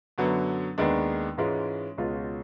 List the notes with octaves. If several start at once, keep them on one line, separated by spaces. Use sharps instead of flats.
F#2 D3 F#3 B3
D#2 D#3 G#3 B3 D4
G#2 E3 G#3 C#4 F4
C#2 B2 G#3 C#4 F4